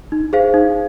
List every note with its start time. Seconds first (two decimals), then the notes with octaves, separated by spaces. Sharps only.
0.12 D#4
0.33 G#4 C5 F5
0.54 D#4